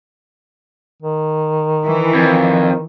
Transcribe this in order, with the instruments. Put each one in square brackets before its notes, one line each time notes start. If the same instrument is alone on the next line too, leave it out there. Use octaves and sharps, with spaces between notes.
[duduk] D#3
[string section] E3
[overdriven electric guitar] F2 [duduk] D#3